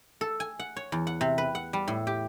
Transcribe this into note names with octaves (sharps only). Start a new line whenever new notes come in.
A4
G#5
F#5
C#5
E2
F#5
C3
B4
F#5
G3
A2
G4